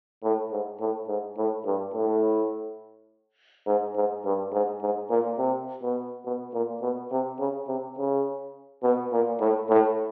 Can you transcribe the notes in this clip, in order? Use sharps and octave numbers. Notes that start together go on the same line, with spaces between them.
A2
G#2
A2
G#2
A2
G2
A2
G#2
G#2
G2
G#2
G#2
A#2
C3
B2
B2
A#2
B2
C3
C#3
C3
C#3
B2
A#2
A2
A2